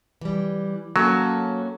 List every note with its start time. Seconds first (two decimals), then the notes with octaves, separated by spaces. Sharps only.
0.21 E3 G3
0.96 F#3 A#3 C#4 A4